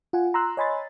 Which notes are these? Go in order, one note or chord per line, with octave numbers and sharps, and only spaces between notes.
F4 F#5 G#5
A#5 C6 E6 F#6
C#5 D#5 G#5 B5 C6 A6